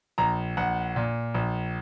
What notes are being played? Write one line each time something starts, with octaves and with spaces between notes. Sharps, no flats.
A#1 A#5
A#1 F#5
A#2
A#1